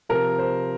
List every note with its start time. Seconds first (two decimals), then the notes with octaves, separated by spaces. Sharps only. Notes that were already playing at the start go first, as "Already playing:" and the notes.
0.09 C3 F3 A#4
0.38 C5